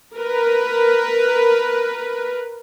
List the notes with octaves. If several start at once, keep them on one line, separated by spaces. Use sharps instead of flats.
A#4 B4